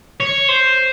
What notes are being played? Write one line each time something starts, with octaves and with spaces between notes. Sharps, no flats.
C#5
C5